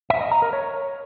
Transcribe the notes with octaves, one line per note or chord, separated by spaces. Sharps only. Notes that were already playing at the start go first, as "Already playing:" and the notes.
E5
D#5
A#5
A#4
C#5